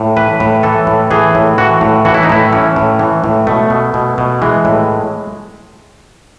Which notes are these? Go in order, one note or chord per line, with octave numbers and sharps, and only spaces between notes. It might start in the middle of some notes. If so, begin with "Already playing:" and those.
Already playing: A2
E3 B4
A2
E3 A4
A2
E3 G#4
A2
E3 F#4
A2
E3 F#4
E4
D#4
A2 E4
E3 C#4
A2
E3
A2
B2 A3
B2
B2
B2
E3 G#3
A2